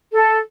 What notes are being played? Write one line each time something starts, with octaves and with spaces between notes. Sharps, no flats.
A4